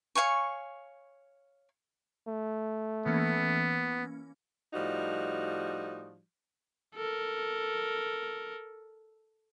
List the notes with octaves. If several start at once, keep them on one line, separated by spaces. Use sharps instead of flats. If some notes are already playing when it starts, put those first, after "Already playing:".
C#5 F5 G#5 C#6
A3
E3 A#3 B3 C#4
A2 F3 G3 D#4 F#4
A4 A#4